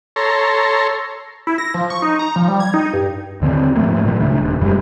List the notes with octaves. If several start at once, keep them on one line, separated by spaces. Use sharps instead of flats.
A4 C#5 A#5 C6
E4
A#6
F3
C#6
D#4
A#5
F3
G3
G#6
D#4
G2
D#2 D3 A#3 C4
G#2 F3 A3 A#3
A#2 E3 F#3
D1 C#3 A3 D4
D#1
F1 F#2 G3 G#3